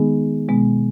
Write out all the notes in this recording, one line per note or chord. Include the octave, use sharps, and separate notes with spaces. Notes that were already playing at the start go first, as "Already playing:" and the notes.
Already playing: D#3 G#3 B3 D#4 G#4
B2 G#3 B3